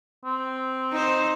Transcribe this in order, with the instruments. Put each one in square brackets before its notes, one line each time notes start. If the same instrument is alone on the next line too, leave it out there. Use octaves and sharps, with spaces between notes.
[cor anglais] C4
[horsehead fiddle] D#4 C5